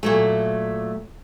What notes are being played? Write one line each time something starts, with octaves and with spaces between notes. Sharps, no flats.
A#2 F#3 A3